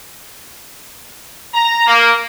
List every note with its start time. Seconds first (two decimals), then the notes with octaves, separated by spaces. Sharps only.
1.53 A#5
1.87 A#3